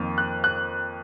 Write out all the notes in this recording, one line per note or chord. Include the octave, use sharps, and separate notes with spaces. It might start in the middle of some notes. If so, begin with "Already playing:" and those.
Already playing: F2 D#3 A#3
F#6
F#6